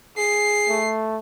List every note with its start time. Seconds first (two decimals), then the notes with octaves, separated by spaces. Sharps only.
0.17 G#4 C7
0.69 A3